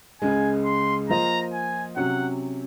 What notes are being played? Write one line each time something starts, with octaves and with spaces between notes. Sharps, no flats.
C#2 C#3 G#3 G#5
C6
F3 A#3 F4 C5 D#5 A#5
G#5
C3 F#3 C#4 F#5